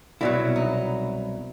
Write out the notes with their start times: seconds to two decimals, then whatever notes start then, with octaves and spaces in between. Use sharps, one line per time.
0.21 C2 B2 F#3 E4
0.56 D#4